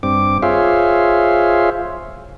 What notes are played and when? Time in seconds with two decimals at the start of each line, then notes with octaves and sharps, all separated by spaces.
0.03 G2 C4 D6
0.42 F4 G#4 C5 C#5 E5 F5